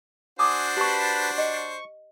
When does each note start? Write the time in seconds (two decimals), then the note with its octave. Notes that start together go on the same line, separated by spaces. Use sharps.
0.39 D4 F#4 C5 G#5 D6 D#6
0.77 G4 B4 A5 B5 C#6
1.38 D#5 C#6